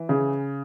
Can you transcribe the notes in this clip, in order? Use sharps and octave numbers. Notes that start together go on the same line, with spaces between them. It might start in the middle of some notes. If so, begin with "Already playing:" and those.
Already playing: E3
C#3